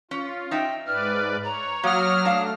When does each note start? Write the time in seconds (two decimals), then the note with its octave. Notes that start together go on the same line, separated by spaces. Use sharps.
0.11 C#4 F4
0.51 D#4 E5 G5
0.87 G#2 B4 D5 F6
1.44 C#5 A#5
1.83 F#3 A#3 D#6 F6
2.25 A3 D4 F5